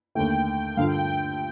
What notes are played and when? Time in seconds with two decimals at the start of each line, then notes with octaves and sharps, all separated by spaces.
0.15 D#2 D3 A3 G5
0.77 G2 D3 F3 F5
0.87 G5
0.98 G5